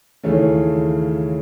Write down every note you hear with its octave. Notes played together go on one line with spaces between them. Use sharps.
D#2 C#3 E3 A3 C#4